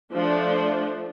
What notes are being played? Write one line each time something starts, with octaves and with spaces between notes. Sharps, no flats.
F3 A3 D4